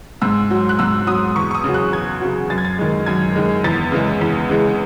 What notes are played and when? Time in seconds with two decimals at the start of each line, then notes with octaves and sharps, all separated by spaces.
0.22 G#2 E6
0.50 F#3
0.69 F#6
0.79 G#2 E6
1.07 F#3 D#6
1.36 E2 C#6
1.51 C#6
1.55 D#6
1.64 C#3 F#3
1.74 F#6
1.92 E2 G#6
2.21 C#3 F#3
2.50 F#2 A6
2.58 G#6
2.65 A6
2.79 D#3 G#3
3.06 F#2 G#6
3.36 D#3 G#3
3.64 E2 A6
3.92 C#3 E3 G#3
4.21 E2
4.50 C#3 E3 G#3